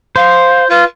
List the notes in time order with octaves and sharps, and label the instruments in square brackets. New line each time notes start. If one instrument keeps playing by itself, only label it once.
[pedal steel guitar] C5 [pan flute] F5
[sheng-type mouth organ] F4 [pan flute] B4